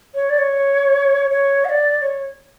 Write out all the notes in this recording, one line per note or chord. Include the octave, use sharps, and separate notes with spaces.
C#5
D5
C#5
C#5
F#5
D5
D5
C#5